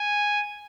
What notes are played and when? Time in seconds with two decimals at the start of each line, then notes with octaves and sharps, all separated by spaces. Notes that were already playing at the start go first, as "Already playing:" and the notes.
Already playing: G#5